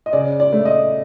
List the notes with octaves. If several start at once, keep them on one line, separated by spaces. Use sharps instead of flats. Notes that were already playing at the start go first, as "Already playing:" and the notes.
D#5
C#3 D5
D5
A3
D#5